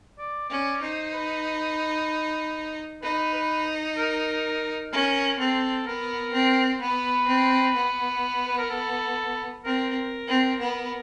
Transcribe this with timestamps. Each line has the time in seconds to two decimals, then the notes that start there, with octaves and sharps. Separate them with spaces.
0.18 D5
0.50 C#4 D5
0.82 D#4 C5
1.13 B4
3.02 D#4 B4
3.34 B4
3.97 A#4
4.92 C#4 A#4
5.39 C4 A4
5.86 B3 A#4
6.33 C4
6.81 B3 B4
7.28 C4
7.75 B3
8.47 B4
8.59 A#4
8.70 A4
9.65 C4 A#4
10.28 C4
10.60 B3